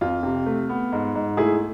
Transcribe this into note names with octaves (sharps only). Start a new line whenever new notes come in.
F2 F4
C3
A3
B3
G#2
G#2
A3 E4 G#4